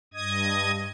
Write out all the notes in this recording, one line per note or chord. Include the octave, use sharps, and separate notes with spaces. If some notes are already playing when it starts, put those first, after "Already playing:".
G2 D#5 D#6 G#6